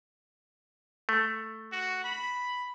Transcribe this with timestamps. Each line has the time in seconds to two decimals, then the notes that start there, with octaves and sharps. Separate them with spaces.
1.09 A3
1.72 F#4
2.04 B5